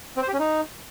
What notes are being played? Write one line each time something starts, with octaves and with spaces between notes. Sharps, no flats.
C4
C5
G4
C#4
D#4